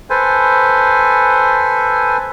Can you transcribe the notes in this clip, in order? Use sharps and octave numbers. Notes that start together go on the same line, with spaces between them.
A4 B4 C5 G#5